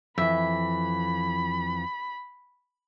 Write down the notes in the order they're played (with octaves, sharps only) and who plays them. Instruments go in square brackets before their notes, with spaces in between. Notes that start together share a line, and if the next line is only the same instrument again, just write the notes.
[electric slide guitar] F2 E3 [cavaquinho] E5 [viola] B5